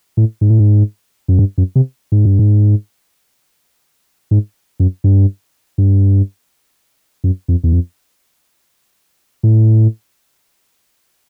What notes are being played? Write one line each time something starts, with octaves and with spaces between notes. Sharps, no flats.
A2
G#2
A2
G#2
F#2
G2
F#2
C3
G#2
G2
G#2
G#2
F#2
G2
G2
F#2
F2
E2
F2
A2